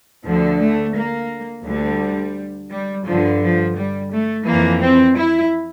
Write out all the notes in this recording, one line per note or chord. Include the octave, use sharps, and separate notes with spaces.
D2 D3 F3
A3
A#3
D2 D3 G3
G3
G2 D3 F3
F3
G3
A3
F2 E3 A#3
C4
E4